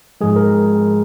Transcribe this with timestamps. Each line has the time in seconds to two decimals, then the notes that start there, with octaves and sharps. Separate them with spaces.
0.21 G#2 F3 G#3 G#4
0.36 A#4